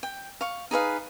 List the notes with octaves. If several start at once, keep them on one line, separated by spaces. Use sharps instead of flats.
G5
F5 C#6
D#4 G#4 B4 F5